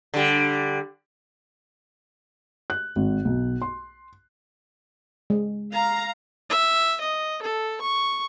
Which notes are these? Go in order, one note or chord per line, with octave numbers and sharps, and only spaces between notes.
D3 G3
F#6
G#1
B1
C6
G#3
F5 A#5
E5
D#5
A4
C#6